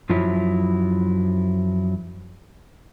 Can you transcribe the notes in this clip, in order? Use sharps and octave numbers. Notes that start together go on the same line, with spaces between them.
F#2 F3 F#3 E4